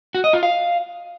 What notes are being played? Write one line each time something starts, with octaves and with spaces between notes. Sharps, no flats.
F#4
D#5
F4
F5